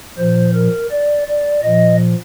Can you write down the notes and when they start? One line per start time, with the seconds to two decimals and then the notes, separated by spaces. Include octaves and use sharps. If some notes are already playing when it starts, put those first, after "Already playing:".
0.17 A#2 F3 C5
0.54 A#4
0.90 D5
1.27 D5
1.63 A#2 F3 D#5